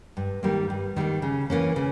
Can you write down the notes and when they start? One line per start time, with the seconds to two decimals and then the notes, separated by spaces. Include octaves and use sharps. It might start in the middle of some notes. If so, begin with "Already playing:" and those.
0.17 G2
0.43 D#3 G3 A#3
0.70 G2
0.96 D#3 G3 A#3
1.22 C#3
1.50 E3 A#3 C#4
1.76 C#3